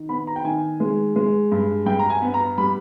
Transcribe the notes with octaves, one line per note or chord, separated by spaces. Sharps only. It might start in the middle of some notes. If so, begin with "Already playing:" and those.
Already playing: D#3
B3 B5
A#5
G5
D#3 G#5
G#3
G#3
G2
G2 G5
A#5
G#5
B3
A#5
G3 B5